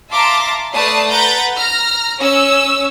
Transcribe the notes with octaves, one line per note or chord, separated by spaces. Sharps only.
E5 F5 A5 A#5 C6 D6
A3 B4 D5 A5 D#6 C7
B4 F#5 A#5 G6 A6
A#5 F6 A#6
C#4 C#5 E6